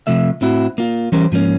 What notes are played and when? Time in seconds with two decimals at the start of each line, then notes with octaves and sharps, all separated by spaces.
0.07 C3 F3 A3 E5
0.41 A2 C4 E4 F#4
0.78 A#3 F4
1.12 E3 G3 C#4 G4 A#4 C5
1.32 G#2 F3 A#3 C#4